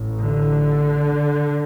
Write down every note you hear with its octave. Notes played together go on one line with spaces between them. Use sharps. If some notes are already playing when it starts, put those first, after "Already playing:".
Already playing: A1 A2
D3